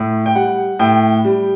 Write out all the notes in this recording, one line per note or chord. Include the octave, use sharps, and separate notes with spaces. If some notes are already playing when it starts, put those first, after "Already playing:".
Already playing: A2
G5
G3 F#5
A2 G5
G3